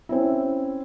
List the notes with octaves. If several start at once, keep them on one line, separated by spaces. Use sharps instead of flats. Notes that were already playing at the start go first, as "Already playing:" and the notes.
C4 C#4 E4